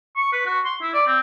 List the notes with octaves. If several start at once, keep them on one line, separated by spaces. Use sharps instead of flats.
C#6
B4
F#4
C6
E4
D5
C4